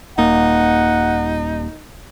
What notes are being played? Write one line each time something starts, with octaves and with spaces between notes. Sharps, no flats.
D#1 A#3 D#4 F#5